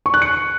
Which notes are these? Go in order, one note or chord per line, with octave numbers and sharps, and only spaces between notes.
C#6
F#6
C#7